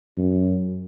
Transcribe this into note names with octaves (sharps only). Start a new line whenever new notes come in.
F#2